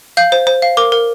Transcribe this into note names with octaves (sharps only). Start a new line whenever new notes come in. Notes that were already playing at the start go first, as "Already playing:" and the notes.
F5 G6
C5
C5
F5
A#4 D6
A#4